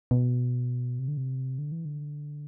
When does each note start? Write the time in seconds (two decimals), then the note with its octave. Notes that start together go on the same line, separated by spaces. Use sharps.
0.11 B2
0.99 C3
1.08 D3
1.17 C3
1.59 D3
1.72 E3
1.85 D3